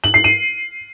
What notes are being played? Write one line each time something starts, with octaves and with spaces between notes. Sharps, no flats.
F#7
C7
D#7